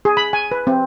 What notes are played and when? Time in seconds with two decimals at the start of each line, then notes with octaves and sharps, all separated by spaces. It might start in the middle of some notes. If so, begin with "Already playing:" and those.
0.05 G#4
0.17 B5
0.33 G#5
0.52 B4
0.67 C4